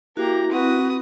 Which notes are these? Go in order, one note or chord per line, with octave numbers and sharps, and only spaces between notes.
A#3 E4 F#4 G4 A#5
C4 F#4 B4 D#6